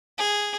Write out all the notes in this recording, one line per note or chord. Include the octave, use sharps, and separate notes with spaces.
G#4